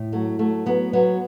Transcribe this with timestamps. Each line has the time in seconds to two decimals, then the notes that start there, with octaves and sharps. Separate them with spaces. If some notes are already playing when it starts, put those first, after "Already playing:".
Already playing: A2
0.12 F#3 A3
0.39 F#3 A3
0.66 F#3 B3
0.93 F#3 B3